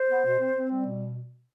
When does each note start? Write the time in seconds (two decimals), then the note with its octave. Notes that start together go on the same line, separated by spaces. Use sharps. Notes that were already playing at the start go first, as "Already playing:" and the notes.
Already playing: C5
0.09 B3
0.25 B2
0.40 C4
0.55 C4
0.71 G3
0.86 B2